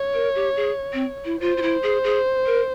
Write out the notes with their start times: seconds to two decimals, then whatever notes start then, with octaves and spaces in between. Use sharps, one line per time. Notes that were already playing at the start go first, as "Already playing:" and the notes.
Already playing: C#5
0.14 A#4
0.35 G4
0.56 G#4
0.93 C4
1.25 E4
1.41 F4 C5
1.57 F4
1.62 E4
1.83 G#4
2.04 G#4
2.46 A#4